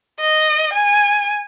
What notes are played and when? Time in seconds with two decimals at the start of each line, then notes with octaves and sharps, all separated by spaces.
0.21 D#5
0.73 G#5